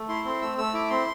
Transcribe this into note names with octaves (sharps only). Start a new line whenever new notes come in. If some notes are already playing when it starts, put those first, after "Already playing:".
Already playing: A3
E4 C6
C4 C6
A3 E6
A3 E6
E4 D6
C4 C6